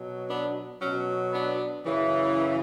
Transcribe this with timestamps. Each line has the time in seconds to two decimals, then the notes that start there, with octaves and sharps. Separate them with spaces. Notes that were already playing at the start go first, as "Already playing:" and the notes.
Already playing: B2 F#3
0.29 B3 D4
0.81 B2 F#3 C#4
1.33 B3 D4
1.85 F#2 C#3 E3